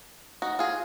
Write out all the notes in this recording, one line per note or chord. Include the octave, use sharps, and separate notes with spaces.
D#4 F#4
F4 G#4